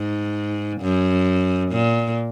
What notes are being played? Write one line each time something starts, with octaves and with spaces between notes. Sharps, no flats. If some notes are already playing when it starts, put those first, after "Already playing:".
Already playing: G#2
F#2
A#2